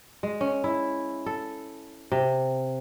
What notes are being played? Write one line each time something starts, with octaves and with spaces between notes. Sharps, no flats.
G#3
C#4
E4
A4
C3